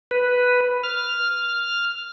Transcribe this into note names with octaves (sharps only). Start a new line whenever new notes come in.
B4
F6